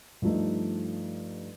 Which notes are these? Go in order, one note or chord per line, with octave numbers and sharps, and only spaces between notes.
G2 F3 A3 D#4